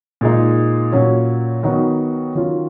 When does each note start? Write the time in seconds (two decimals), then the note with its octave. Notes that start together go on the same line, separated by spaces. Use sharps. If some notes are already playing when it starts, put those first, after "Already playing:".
0.21 A#2 G#3 D#4
0.92 A#2 F#3 C#4
1.63 D#3 F#3 B3 D#4 F#4
2.35 D#3 F#3 C#4 F4